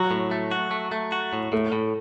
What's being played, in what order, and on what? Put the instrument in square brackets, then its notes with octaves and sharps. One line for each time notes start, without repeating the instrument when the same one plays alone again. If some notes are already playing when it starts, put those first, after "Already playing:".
Already playing: [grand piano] F#3 [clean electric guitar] F#4
[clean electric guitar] A2
A3
F#4
A3
A3
F#4
A2
[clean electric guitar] A2 [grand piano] A3
[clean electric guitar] A2